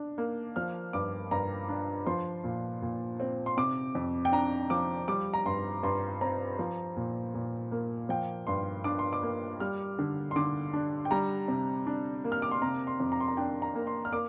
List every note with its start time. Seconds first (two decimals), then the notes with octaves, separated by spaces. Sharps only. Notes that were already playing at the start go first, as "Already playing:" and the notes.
Already playing: D4
0.18 A#3
0.56 F3 F6
0.93 G2 D6
1.31 G2 A#5
1.69 D4
2.07 F3 C6
2.44 A#2
2.82 A#2
3.20 C4
3.46 C6
3.57 C3 D6
3.95 F2
4.25 G5
4.32 D4 A#5
4.70 F3 D6
5.08 G3 D6
5.34 A#5
5.46 G2 C6
5.83 G2 C6
6.21 C4 A#5
6.59 F3
6.96 A#2
7.34 A#2
7.72 A#3
8.09 F3 G5
8.47 G2 C6
8.84 D4 D6
8.99 C6
9.13 D6
9.23 A#3
9.60 G3 F6
9.99 D3
10.31 C6
10.36 D3 D6
10.73 D4
11.05 G5
11.11 G3 A#5
11.48 C3
11.87 D4
12.24 A#3
12.32 F6
12.42 D6
12.51 C6
12.62 C3 A#5
12.87 C6
13.00 F2
13.12 A#5
13.20 C6
13.28 A#5
13.37 D4 G5
13.62 A#5
13.75 A#3
13.87 C6
14.05 F6
14.12 A#3 D6